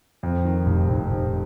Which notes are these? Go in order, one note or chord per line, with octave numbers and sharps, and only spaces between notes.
F2
D#3
F1
F1
F1